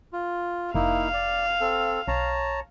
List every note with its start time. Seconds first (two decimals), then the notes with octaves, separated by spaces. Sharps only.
0.13 F4
0.75 F1 A#3 D#4 E4 F5
1.13 D5
1.60 C4 A4
2.08 B1 C#5 A5 A#5